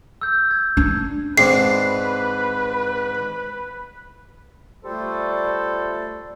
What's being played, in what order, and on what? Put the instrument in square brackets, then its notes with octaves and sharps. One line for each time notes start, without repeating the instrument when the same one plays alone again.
[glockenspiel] E6 G6
G#6
[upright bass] D4
[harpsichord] G#2 C4 D4 [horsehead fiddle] B4 [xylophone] C7
[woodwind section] G3 A3 F4 A4 C5 D5